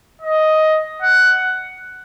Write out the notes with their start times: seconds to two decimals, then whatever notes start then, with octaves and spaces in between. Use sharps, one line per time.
0.21 D#5
1.02 F#5